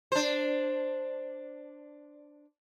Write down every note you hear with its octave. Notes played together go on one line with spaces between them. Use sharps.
D4 C5